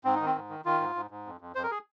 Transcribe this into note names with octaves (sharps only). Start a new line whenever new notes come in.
G#2 C4
D#3 D#4
C4
G#2
D#3
D#3 F4
G#2
G#2
G#2
F2
F2
F2 C5
A#4
G#4